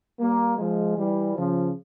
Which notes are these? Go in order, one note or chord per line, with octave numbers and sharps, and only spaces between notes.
G3 A#3
F3 G#3
E3 G3
C#3 F3